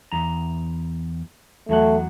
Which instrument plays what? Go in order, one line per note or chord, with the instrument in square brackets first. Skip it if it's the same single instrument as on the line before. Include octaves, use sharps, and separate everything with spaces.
[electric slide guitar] E2 A#5
[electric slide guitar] E2 F#3 F#5 [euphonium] A3